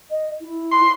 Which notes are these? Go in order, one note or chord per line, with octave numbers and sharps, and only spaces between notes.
D#5
E4
C6